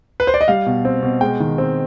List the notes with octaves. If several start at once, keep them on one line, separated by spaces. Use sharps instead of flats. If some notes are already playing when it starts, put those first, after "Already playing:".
B4
C5
D5
D#5
G3 F5
B2
C4
B2
G#3 G5
D#3
C4